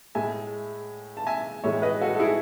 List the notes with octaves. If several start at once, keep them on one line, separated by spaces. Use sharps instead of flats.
A2 G#3 E5 G#5
A5
E5 G#5
A2 E3 G#3 C#5 E5
B4 D#5
F#4 A4
A4
E4 G#4